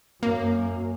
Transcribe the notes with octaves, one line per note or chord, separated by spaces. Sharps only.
F#2 A#3